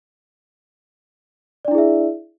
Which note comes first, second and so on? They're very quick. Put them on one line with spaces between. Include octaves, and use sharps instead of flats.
D5 D4 E4 G#4 E5